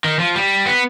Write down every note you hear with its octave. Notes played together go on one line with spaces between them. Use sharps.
D#3
F3
G3
B3